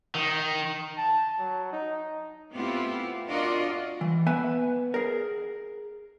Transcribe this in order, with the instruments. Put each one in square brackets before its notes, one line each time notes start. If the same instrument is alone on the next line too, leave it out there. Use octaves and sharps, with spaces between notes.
[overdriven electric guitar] D#3
[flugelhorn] A5
F#3
D#4
[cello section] A3 B3 C4 E4 F4 G4
D4 F4 F#4 A#4 D5 D#5
[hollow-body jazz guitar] E3
B3 B4 E5 G#5
G#4 A#4